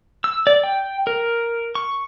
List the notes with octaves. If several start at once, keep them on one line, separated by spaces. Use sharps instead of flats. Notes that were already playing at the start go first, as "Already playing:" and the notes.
E6
D5
G5
A#4
C#6